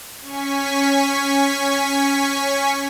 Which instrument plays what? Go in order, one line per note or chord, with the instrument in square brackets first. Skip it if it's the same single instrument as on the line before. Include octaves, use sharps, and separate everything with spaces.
[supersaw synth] C#4 G#5 C#6 B6